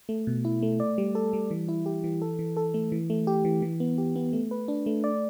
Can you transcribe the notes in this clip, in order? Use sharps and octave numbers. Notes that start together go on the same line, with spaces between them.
A3
B2
E4
A3
D5
G3
A4
G3
E3
E4
G4
E3
A4
E3
A4
A3
E3
A3
G4
E3
E3
B3
G4
B3
A3
B4
D4
A3
D5